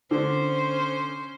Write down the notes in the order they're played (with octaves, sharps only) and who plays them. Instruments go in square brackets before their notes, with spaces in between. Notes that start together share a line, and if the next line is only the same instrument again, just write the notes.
[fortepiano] D3 [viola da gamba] C#4 C5